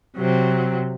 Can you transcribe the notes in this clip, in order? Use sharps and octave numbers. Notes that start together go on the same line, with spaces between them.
C3 F#3 C4